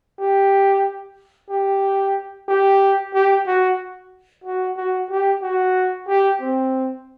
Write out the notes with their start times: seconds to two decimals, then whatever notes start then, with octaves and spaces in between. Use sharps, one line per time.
0.20 G4
1.50 G4
2.48 G4
3.14 G4
3.47 F#4
4.44 F#4
4.77 F#4
5.11 G4
5.43 F#4
6.08 G4
6.41 C4